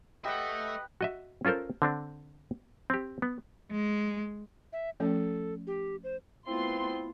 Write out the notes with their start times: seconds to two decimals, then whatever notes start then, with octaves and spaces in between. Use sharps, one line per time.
0.25 A3 G4 B4 D#5 E5 F#5
1.01 F#4 D#5 E5
1.45 C#4 F4 A4 A#4 C5
1.82 D3 C4 D4
2.90 C4 G4
3.22 B3
3.71 G#3
4.73 E5
5.00 F3 A3 C#4 A4
5.67 G4
6.04 C5
6.47 A3 B3 C4 E4 F4 C6